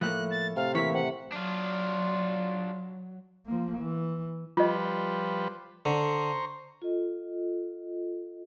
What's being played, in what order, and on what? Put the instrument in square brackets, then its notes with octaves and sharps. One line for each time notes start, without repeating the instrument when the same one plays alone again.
[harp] A2 [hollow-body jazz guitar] F3 A3 A#3 [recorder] F#6
[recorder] A6
[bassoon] C3 [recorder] F5
[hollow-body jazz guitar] E3 A#3 [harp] E5 C#6 [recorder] B6
[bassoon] C3 [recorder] F#5
[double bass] F#3 [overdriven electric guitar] D4 F4
[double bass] F3 A#3
E3
[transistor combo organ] F3 G3 B4 [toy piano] F4 D#5
[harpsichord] D3 [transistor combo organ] C5 A#5 C#6
[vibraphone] F4 A4 D#5